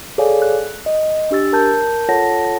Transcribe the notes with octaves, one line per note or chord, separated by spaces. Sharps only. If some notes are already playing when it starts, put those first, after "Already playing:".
G#4 A4 C#5 D5 F5 G#5
F#6
D#5
D4 G4 E6 A6
A#4 A5 G6
F4 A4 C#5 F#5 A5 A#6